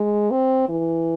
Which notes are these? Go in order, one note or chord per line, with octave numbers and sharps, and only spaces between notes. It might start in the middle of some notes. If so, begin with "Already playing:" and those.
Already playing: G#3
C4
E3